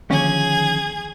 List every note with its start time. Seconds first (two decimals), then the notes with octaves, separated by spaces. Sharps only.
0.10 D#2 D3 F3 C#4 G#4 G#6